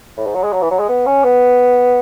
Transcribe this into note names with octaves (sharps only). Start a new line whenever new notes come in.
A2
G#2
F#3
G#3
F#3
E3
F#3
G#3
B3
C#4
B3